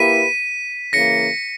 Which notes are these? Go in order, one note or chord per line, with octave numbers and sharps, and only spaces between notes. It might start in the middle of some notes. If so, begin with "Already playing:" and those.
Already playing: A#3 E4 G4 B4 B6 D#7
C#3 E3 A#3 A#6 C#7